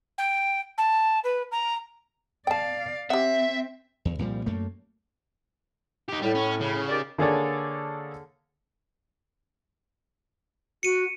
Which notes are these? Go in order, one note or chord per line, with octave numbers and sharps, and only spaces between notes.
G5
A5
B4
A#5
D5 F5 G5 A5
C4 G4 E5 F#5
E2
C2 A#2 F3 G3
F#2 A3 A#3
D#4 G4
A2 G3
C#4
C#3
D#3 G4 D5
D3 A#3 G#4 A4 C#5 D5
F#4 C#7 D#7